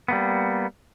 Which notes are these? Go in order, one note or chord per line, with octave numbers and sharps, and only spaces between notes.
G3 A#3 B3